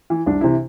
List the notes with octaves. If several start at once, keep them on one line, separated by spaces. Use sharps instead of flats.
E3
C2 D4
C3 E3 E4